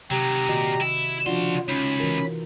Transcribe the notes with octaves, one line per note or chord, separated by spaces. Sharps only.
C3 D#3 F#3 G4 A#5
A#2 D#3 F#4 D#5
E4
C#3 F3 D4 F4 F#4 C6
C#2 C#4 D#4 B5
E3 F#4 A#4